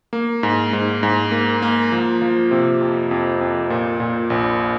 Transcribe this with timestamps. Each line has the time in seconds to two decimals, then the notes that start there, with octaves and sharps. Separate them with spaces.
0.13 A#3
0.43 G#2
0.73 G#2
1.03 G#2
1.31 A#3
1.62 A#3
1.92 F3
2.22 F3
2.51 C3
2.81 F2
3.11 F2
3.41 F2
3.70 A#2
4.00 A#2
4.30 A#1